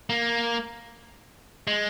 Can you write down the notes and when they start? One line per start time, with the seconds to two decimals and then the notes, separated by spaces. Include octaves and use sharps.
0.10 A#3
1.67 G#3